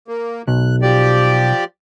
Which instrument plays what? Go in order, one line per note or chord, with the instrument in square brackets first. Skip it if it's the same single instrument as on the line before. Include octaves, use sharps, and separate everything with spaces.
[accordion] A#3
[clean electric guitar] B1 [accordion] F#6
[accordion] F3 G4 D5